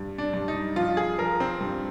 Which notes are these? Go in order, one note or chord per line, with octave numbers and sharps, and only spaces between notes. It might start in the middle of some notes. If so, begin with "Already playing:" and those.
Already playing: G2
D4
G2
D#4
F3 F4
G#4
F3 A#4
C4
G2